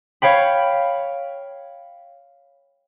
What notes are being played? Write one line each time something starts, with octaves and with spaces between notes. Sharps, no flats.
C#5 F5 G5 B5